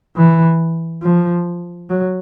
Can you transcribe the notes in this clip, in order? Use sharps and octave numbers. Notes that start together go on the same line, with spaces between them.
E3
F3
F#3